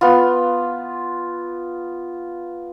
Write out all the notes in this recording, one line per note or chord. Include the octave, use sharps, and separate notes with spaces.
B3 F4